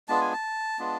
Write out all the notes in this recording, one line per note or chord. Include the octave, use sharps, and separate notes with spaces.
G#3 B3 D4 F4 A5
G#5
A5
G#3 B3 D4 F4